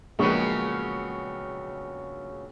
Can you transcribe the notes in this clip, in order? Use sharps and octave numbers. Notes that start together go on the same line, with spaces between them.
A#1 C#3 F#3 G#3 B3 C#6